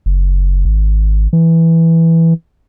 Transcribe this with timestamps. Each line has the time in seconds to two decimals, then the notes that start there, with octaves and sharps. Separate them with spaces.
0.06 F#1
0.65 G#1
1.33 E3